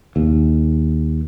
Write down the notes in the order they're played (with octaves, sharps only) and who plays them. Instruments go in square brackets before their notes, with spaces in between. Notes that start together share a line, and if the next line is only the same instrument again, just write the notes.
[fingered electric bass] D#2